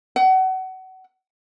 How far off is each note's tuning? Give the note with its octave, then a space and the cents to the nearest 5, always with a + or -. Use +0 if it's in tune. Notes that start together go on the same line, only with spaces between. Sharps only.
F#5 +30